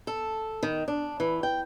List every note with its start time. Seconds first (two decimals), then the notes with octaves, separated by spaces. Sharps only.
0.07 A4
0.63 D#3
0.88 D4
1.20 E3
1.43 G5